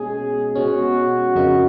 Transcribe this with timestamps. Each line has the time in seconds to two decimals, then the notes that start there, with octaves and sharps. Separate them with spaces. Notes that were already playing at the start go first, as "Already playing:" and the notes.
Already playing: B2 G#3 C#4 G#4
0.55 B2 G#3 C#4 F#4
1.35 F2 C#3 F#3 A#3 D#4